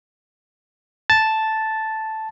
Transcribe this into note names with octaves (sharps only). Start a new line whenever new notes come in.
A5 A6